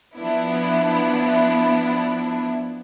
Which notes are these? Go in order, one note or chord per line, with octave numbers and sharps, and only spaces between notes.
F3 B3 D4 E4